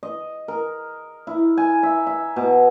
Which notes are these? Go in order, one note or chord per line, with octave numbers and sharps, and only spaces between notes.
D#5
A#4
E4
G#5
E5
E5
B2